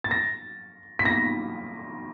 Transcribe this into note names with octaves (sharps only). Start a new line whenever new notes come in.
A6
A#6
B6
A#6